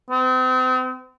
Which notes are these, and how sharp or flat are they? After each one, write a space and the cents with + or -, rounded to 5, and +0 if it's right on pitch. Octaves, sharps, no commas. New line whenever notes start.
C4 -40